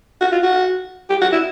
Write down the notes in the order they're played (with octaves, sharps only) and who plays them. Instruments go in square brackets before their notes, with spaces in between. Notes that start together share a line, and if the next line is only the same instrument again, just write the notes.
[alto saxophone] F#4
F4
F#4
G4
F#4
E4